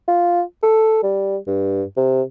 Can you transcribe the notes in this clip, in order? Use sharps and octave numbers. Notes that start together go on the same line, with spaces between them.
F4
A4
G3
G2
C3